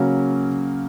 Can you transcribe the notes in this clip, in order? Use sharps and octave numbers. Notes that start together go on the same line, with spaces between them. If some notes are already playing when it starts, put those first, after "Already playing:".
Already playing: C#3 F#3 A#3 C#4